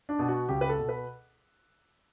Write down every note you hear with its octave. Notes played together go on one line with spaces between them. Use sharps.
D4
B2
F#4
C#2 G4
B4
A4
B2
B4